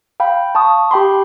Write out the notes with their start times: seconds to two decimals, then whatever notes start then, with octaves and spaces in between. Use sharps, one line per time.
0.20 F5 G5 B5
0.55 A5 C#6 D#6
0.91 G4 G5 B5 C6